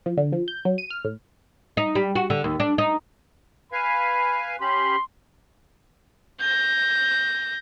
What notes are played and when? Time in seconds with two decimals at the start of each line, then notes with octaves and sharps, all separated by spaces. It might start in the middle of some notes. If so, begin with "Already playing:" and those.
0.06 F3
0.17 D3
0.33 F3
0.48 G6
0.65 F#3
0.78 D#7
0.90 F6
1.05 A2
1.77 D#4
1.95 G3
2.16 F#4
2.30 D3
2.44 D#2
2.60 D4
2.78 D#4
3.72 B4 F5 G#5 B5
4.61 C#4 G4 B5 C6
6.40 G6 A#6